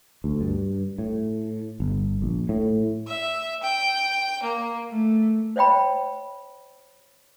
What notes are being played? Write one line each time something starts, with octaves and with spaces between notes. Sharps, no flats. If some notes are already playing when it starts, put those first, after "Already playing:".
D2
G2
A2
G1
A#1
A2
E5
G5
A#3
A3
C5 C#5 D#5 G5 B5